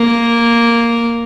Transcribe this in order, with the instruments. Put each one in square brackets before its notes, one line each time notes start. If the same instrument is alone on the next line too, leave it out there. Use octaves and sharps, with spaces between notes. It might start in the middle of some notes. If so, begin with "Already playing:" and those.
Already playing: [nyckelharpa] A#3